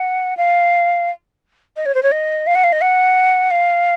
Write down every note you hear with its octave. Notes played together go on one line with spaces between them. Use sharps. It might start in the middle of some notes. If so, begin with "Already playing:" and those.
Already playing: F#5
F5
D#5
C#5
C5
C#5
D#5
F5
F#5
F5
D#5
F#5
F5